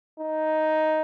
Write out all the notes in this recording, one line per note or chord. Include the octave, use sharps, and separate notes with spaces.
D#4